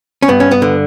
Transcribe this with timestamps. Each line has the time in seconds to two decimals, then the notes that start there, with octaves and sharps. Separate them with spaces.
0.23 C#4
0.28 G2 B3
0.40 C#4
0.51 B3
0.62 D3